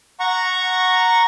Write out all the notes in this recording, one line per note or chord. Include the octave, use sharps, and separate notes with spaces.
F#5 A#5 C#6